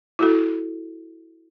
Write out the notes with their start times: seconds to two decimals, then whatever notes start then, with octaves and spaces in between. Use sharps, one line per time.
0.19 E4 F#4 A4